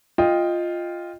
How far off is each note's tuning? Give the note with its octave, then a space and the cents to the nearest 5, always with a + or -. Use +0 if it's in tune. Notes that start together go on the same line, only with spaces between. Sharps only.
F4 +0 D#5 +0 G5 +15